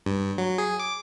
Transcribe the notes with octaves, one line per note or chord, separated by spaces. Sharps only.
G2
F#3
G#4
D6